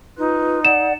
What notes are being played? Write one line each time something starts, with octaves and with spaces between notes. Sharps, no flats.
D#4 F4 B4
D5 F#5 E7